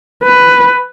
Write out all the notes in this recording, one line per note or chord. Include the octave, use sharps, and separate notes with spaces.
B4